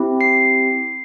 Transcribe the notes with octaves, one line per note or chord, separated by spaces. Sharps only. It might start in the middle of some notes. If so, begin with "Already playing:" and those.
Already playing: C4 E4 G4
C7